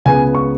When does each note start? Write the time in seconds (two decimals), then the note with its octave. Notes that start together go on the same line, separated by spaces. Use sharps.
0.05 C#2 C#3 G#3 B3 G#5
0.35 C#6